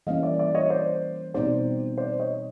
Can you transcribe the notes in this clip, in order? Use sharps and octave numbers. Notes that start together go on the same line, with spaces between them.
E3 G3 A#3 C#4 D#5 F5
D5 E5
D5 E5
C#5 D#5
C5 D5
B2 G3 C4 D#4 G4 C5 D5
C5 D5
C#5 D#5